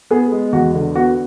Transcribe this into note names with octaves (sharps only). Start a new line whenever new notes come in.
B3 G#4
G#3
E2 F#4
D3
B3 F#4